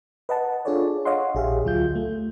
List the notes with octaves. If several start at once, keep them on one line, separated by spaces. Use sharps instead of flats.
B4 D#5 F#5 A5
D4 F4 G#4 A4 C#5 D5
C#5 D#5 F5 F#5 C6
A#1 G4 G#4 E5 F5
D2 F#3 F4 G6
A3